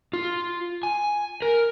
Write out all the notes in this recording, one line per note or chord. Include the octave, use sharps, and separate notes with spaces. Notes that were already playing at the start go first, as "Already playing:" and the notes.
F4
G#5
A#4